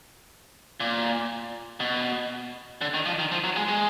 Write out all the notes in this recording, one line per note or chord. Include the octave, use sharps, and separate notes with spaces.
A#2
B2
D3
D#3
F3
D#3
F3
F#3
G#3
G#3